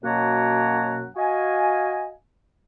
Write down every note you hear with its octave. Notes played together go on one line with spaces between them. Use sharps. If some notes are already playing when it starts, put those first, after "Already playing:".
F#2 B2 A#3 C#5 F#5 A#5
F#4 D#5 F5 G#5